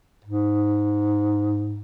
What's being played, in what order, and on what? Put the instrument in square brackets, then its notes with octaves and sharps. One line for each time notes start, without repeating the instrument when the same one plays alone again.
[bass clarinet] G#2